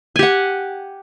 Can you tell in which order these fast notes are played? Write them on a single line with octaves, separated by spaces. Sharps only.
G#5 G4 F#5